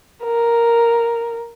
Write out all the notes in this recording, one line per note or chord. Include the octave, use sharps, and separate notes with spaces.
A#4